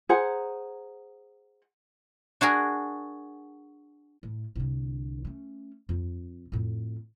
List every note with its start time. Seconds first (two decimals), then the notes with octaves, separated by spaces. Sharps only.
0.09 G#4 C5 F#5 A#5
2.41 D4 F#4 G#4 A#4
4.23 A2
4.55 C2 D3
5.25 A3 C#4
5.89 F2
6.52 F2 A2